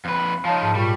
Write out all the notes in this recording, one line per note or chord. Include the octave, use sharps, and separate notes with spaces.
F2 B4
F3 D#4 C#5 F5 A5
G#2 A5
A#2 G3 F4 C#6